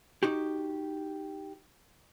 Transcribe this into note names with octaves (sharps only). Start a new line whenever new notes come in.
D#4 F#4 G4